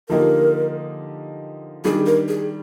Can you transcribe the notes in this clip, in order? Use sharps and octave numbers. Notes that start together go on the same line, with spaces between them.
D3 F3 A#3 D#4 G4 A#4
D#3 G3 D4 G#4
A#4
G#4